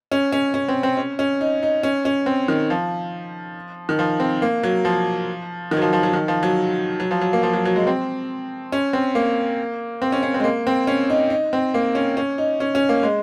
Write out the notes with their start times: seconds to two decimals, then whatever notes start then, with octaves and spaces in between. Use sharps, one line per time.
0.12 C#4
0.32 C#4
0.54 C#4
0.68 C4
0.83 C4
0.97 C#4
1.19 C#4
1.41 D#4
1.63 D#4
1.83 C#4
2.05 C#4
2.26 C4
2.48 D#3
2.70 F3
3.89 D#3
3.99 F3
4.20 C4
4.42 A#3
4.63 F#3
4.85 F3
5.71 D#3
5.77 F#3
5.82 F3
5.93 F3
6.03 F#3
6.13 D#3
6.28 F3
6.43 F#3
7.00 F#3
7.11 F3
7.21 F#3
7.33 A#3
7.43 F3
7.53 F#3
7.65 F#3
7.76 G#3
7.87 C4
8.72 C#4
8.93 C4
9.15 A#3
10.02 C4
10.12 C#4
10.23 C#4
10.34 C4
10.40 G#3
10.44 A#3
10.67 C4
10.87 C#4
11.10 D#4
11.30 D#4
11.53 C4
11.74 A#3
11.95 C#4
12.17 C#4
12.38 D#4
12.60 C#4
12.75 C#4
12.89 A#3
13.03 G#3